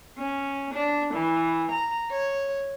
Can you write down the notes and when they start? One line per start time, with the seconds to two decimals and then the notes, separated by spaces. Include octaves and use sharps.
0.19 C#4
0.74 D4
1.15 E3
1.71 A#5
2.11 C#5